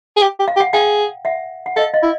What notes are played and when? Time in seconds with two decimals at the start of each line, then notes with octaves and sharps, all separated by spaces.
0.17 G#4
0.22 G4
0.40 G4
0.48 F5
0.56 G4
0.60 F#5
0.73 G#4 F5 G5
1.25 E5 F#5
1.66 F#5
1.76 A4 D#5 F5
1.94 D#5 F5
2.03 E4